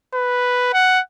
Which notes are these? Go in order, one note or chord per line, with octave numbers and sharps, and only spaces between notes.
B4
F#5